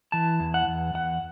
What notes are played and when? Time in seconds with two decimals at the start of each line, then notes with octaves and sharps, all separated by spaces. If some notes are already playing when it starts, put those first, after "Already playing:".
0.12 E3 A5
0.40 E2
0.54 F#5
0.68 E2
0.94 E2 F#5